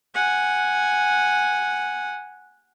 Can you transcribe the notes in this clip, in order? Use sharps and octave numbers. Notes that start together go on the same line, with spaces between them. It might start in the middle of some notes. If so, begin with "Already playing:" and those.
F#5 G#5